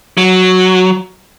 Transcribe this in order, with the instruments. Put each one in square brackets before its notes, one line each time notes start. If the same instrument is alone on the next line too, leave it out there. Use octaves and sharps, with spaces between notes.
[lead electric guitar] F#3